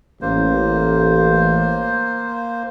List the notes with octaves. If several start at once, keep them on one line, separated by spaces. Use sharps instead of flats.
A1 A#3 C5